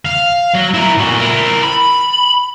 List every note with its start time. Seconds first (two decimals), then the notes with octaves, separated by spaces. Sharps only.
0.06 F5
0.54 F#3
0.74 E4 A#4
0.98 A#2 F#4
1.18 E4 A#4
1.63 B5